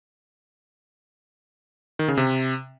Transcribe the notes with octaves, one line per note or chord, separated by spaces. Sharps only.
D#3
C#3
C3